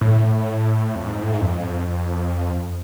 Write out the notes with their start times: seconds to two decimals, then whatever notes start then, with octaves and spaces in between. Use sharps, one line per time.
0.01 A2
0.95 F2
1.06 G#2
1.23 A2
1.33 G#2
1.41 F2